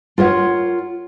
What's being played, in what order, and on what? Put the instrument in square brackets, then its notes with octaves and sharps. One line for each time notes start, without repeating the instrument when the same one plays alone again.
[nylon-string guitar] F4 A#4 C#5 F#5